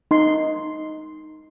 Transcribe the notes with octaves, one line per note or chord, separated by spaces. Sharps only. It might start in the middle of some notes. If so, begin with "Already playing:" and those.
D#4 C6